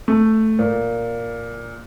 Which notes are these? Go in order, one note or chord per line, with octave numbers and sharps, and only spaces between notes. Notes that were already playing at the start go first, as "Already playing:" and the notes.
A3
A#2